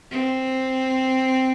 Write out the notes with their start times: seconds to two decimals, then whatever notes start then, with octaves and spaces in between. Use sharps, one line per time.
0.11 C4